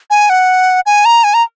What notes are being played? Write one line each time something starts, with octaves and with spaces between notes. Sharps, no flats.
G#5
F#5
G#5
A#5
G#5
A#5